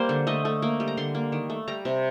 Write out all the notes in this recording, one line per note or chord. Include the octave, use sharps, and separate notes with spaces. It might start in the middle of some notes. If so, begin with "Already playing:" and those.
Already playing: G3 A#3 C5
D3
A3 D#5
A3
A#3
G3
A#5
D3 C6
A#3
D#3
A3
G3 A#5
C3